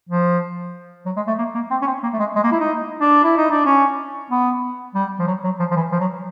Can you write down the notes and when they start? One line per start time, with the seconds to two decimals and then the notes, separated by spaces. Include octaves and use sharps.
0.09 F3
1.06 F#3
1.16 G#3
1.27 A3
1.38 A#3
1.54 A#3
1.71 C4
1.82 C#4
1.86 C4
2.03 A#3
2.13 A3
2.19 G#3
2.36 G#3
2.43 A#3
2.52 E4
2.60 D#4
3.01 D4
3.24 E4
3.37 D#4
3.51 D4
3.66 C#4
4.30 B3
4.95 G3
5.19 F3
5.27 F#3
5.44 F#3
5.59 F3
5.71 F3
5.76 E3
5.92 F3
6.00 F#3